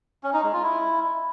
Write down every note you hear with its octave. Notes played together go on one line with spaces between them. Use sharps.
C#4
D#4
G#3
F4
E4